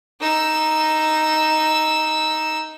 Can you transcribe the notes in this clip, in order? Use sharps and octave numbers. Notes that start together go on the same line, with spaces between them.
D#4 E6